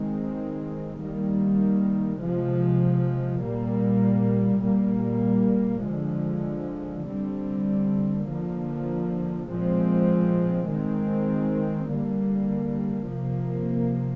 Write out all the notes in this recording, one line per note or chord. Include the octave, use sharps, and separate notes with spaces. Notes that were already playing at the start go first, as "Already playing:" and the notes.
Already playing: D#3 G#3 C4
D#3 G3 A#3
C3 F3 G#3
A#2 G3 A#3
A#2 G3 A#3
D3 F3 G#3
D3 G3 C4
D3 F3 A#3
A#2 F3 G#3 C4
D#3 G#3 C4
D3 G3 A#3
C3 F3 A#3